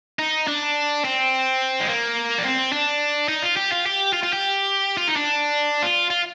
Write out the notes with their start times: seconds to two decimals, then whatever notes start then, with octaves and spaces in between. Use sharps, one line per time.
0.19 D#4
0.47 D4
1.04 C4
1.80 G#3
1.88 A#3
2.38 D4
2.44 C4
2.72 D4
3.28 D#4
3.43 F4
3.57 G4
3.72 F4
3.86 G4
4.13 F4
4.23 F4
4.33 G4
4.97 F4
5.08 D#4
5.16 D4
5.82 F4
6.10 F4